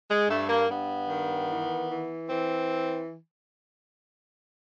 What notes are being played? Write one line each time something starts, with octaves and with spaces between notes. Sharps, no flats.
G#3
G2 A3
A#3
G2 B3
D#3
E3
E3
E3 C4